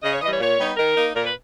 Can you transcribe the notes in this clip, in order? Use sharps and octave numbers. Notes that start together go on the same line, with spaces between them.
C#3 D#5
C#5
E3 D#5
G3 C#5
A#2 C#5
G3 B3 D#4
D#3 A#4
A#3 D#4
A#2 A#4
B4